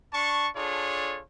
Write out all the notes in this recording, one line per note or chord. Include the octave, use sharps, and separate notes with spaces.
D4 A5 C#6
D4 F4 G#4 A4 C#5